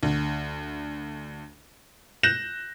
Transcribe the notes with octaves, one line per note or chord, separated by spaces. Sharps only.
D2
F#6 G6 A#6 E7